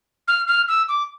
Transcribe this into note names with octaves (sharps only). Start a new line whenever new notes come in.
F6
F6
E6
D6